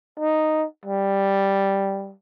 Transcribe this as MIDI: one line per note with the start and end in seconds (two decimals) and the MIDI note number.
0.20 0.66 63
0.86 2.13 55